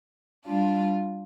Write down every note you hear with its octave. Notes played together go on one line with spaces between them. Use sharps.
G3 D4 F4